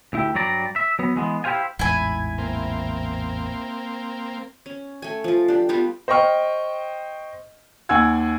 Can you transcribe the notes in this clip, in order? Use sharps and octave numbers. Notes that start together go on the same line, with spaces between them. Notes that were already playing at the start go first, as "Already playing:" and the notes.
D2 E4 G4
G2 F#3 G3 D5 A#5
E5
F#3 B3
E3 G#3 B3
E4 G4 C5 F5 G#5
A1 E2 G#2 E4 G#5
A#3 C4
C#4
A3 G#5
F3 F4
D4 G4
G3 B3 F4 G4
C5 D#5 G5 C#6 F6
D#2 F#5 G#5 E6 G#6